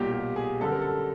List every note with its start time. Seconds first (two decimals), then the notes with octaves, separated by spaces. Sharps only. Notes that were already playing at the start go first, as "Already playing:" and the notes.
Already playing: B1 A#2 G3 A#3 G4
0.12 G4
0.36 G#4
0.61 F#2 D3 G3 A4
0.72 A#4
0.82 A4